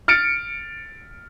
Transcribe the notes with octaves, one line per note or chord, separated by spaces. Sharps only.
F6 A6 C#7 D7